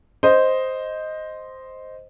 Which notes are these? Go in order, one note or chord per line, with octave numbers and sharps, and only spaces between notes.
C5 D#5